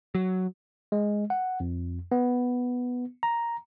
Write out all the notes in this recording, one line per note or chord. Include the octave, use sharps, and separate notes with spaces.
F#3
G#3
F#5
F2
B3
A#5